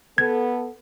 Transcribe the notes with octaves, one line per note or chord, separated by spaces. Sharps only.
B3 A4 G#6